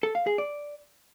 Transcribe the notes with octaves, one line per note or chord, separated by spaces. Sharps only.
A4
F5
G#4
D5